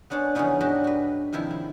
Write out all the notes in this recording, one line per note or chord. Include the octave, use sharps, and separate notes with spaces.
B3 C#4 D4 C5 C#5
C#3 E3 F3 B3 C#4 D#4
G#2 F#3 D4 F#4 G4 D#5
F#4 B4
C3 D#3 F3 E4
E4